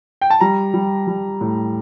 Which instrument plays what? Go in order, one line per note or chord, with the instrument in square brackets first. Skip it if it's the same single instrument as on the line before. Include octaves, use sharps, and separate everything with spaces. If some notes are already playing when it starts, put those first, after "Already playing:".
[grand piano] G5
A5
G3 A#5
G3
G3
A2